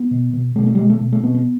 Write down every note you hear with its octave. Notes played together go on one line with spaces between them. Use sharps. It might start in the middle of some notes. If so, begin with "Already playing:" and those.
Already playing: B3
B2
B2
B2 A3
A#3
A3
G3
B2 G#3
A3
B2
A3
B2 B3
B3